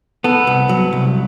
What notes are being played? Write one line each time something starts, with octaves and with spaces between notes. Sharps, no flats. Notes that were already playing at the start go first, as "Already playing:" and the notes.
B3 A4
C2
F#3
C2